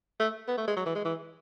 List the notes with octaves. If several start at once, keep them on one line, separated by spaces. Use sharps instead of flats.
A3
B3
A3
G#3
F#3
E3
G#3
E3